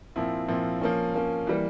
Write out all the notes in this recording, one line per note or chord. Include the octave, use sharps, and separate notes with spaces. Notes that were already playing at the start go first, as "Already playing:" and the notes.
A#2 F3 C4 E4
A#2 F3 C4 E4
F3 A#3 C#4
F3 A#3 C#4
E3 G3 A#3